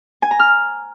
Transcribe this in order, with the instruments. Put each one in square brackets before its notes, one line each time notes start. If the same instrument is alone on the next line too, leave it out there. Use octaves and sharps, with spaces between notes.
[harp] G#5
A#5
F6